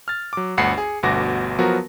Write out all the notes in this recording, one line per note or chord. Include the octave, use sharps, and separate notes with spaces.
F6 A6
F#3 D6
G1 D2 F#5 B5 C7 C#7
G#4
G1 D2 B2 F#4 D6 A#6
F3 F#3 B3 F#4 A#4